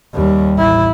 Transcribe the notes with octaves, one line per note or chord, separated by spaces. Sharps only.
D#2 G3
A1 E4